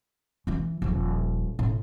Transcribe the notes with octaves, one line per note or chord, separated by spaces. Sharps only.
E3 E4
D#1 F3
A2